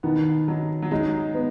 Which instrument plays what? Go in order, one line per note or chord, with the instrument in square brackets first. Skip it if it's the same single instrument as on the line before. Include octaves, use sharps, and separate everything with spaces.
[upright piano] B2 B3 [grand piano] D#3
[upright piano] F#3 [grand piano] D#4
[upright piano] F#3
[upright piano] G#3 [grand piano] D#4
[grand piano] B3